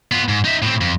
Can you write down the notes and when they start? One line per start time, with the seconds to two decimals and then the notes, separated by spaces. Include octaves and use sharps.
0.12 B3 F4
0.28 G#2
0.45 D#4 E5
0.62 A2 C4
0.81 F2